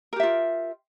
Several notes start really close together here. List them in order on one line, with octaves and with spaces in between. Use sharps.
A#4 G4 E5 F4